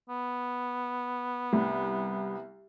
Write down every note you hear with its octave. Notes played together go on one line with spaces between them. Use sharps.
B3
C2